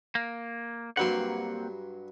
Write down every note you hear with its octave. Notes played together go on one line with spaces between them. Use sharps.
A#3
G2 F#3 A#3 C4 F#5 C6